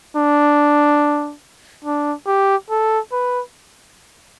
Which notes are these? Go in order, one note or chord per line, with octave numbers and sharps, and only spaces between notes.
D4
D4
G4
A4
B4